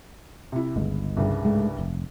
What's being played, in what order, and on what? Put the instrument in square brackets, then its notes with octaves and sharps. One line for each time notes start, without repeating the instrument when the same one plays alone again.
[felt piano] C3 E4
[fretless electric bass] G1 [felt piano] C#2
[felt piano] C2 G2 C#3
[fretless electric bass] G#2 G#3 A3
F1